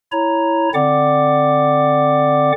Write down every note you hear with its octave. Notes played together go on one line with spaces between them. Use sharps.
E4 C#5 A#5
D3 C4 D5 F#5 D6